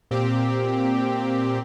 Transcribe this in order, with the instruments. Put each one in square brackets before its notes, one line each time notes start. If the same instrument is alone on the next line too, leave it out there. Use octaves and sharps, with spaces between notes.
[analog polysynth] A#2 C4 G4